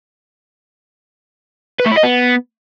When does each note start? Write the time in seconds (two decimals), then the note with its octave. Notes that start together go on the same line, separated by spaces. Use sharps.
1.80 B4
1.85 A3
1.91 E4
1.97 D#5
2.03 B3